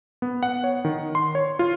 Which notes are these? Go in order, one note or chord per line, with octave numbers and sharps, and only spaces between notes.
B3
F#5
C#5
D#3
C6
C#5
F4